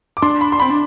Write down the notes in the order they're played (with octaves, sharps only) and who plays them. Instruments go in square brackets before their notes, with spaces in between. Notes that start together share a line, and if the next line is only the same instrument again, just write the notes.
[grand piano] D6
[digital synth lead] D4 [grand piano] C6
[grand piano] B5
C6
[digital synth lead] C4 [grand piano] B5
[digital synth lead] D4